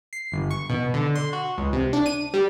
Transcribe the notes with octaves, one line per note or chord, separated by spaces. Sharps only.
C7
G1
C#6
B2
D3
C6
F#4
C#2
C3
D4
D#7
G3